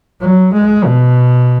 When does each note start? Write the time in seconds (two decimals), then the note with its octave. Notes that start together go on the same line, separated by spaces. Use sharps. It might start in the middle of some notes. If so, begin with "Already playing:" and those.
0.21 F#3
0.54 G#3
0.86 B2